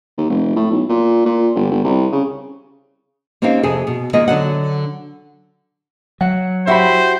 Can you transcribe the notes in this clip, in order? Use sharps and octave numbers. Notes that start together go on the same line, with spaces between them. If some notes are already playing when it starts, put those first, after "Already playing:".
D#2
F1
A2
B1
A#2
A#2
G1
G1
C2
C#3
A#3 C4 C#4 D#4 G4 F5
F2 C3 G#4 A4
B2
D#3 G#3 A#3 F4 G#4 D#5
D3 F#3 F#5
F#3 F#5
E4 F#4 G4 C5 E5 B5